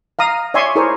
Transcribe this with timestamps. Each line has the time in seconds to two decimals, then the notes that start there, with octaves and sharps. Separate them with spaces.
0.19 F5 A#5 D#6
0.54 C#5 D5 E5 G#5 C6 C#6
0.75 E4 G#4 A#4 C5 C#5